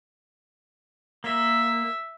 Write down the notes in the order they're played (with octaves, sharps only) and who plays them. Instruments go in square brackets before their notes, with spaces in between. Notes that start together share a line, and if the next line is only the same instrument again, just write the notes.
[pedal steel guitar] A#3 [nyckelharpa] E5